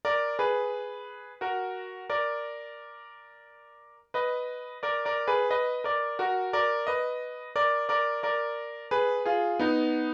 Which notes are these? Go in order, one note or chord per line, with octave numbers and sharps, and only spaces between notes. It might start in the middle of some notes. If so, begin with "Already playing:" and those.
A#4 D5
G#4 B4
F#4 A#4
A#4 D5
B4 D#5
A#4 D5
A#4 D5
G#4 B4
B4 D#5
A#4 D5
F#4 A#4
A#4 D5
B4 D#5
A#4 D5
A#4 D5
A#4 D5
G#4 B4
F4 G#4
B3 D#4